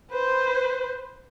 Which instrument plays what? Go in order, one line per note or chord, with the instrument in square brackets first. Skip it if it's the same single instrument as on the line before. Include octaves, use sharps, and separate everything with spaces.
[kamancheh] B4 C5